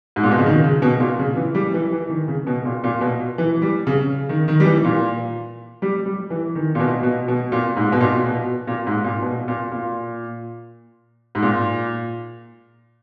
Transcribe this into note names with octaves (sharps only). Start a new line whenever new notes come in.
G#2
A#2
B2
C#3
D#3
C#3
B2
A#2
C#3
E3
G3
E3
E3
D#3
C#3
B2
A#2
A#2
B2
E3
G3
C#3
D#3
D#3
G3
E3
A#2
G3
G3
E3
D#3
A#2
B2
B2
B2
A#2
G#2
B2
A#2
B2
A#2
G#2
A#2
B2
A#2
A#2
G#2
A#2